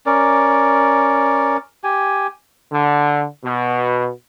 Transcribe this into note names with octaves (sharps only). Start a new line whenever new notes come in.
C#4 A#4 D5
G4 G#5
D3
B2